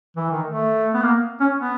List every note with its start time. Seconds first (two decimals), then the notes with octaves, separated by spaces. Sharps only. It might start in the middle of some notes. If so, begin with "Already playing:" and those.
0.17 E3
0.31 D#3
0.46 A3
0.94 B3
1.02 A#3
1.40 C#4
1.59 B3